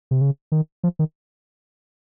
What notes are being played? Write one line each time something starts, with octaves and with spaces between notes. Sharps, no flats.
C3
C#3
D#3
F3
D#3